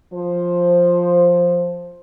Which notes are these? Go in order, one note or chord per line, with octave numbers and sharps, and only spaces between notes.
F3 C5